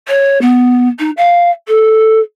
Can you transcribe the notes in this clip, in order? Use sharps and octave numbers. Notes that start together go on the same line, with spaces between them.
C#5
B3
D#4
F5
A4